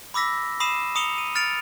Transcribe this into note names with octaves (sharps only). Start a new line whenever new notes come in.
B5 D6 E6 A#6 B6
B5 D#6 C7 D#7 E7
A#5 D#6 C#7 F7 G7
D#7
F6 A6 C#7 D7 F7